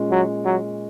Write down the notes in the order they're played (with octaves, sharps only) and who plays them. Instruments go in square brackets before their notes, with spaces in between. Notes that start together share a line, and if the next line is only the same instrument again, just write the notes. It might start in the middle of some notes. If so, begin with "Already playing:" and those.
Already playing: [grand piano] A#2 G#3 C#4
[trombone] F#3
F#3